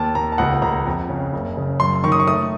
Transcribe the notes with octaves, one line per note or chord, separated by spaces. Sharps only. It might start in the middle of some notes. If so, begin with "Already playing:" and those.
Already playing: D#2 A5
D#2 A#5
A5
C#2 F#5
C#2 A#5
F2
C#3
F#1
C#3
F#2 C6
D#3 C#6
D#6
C#6
A3 D#6